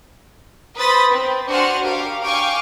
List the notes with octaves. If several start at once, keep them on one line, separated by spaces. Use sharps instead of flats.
B4 C5 B5 D#6 A6 B6
C4
D4 F#4 C5 F#5 G#5 F6
G4 A#4 F5
F5 G5 G#5 C#6 D6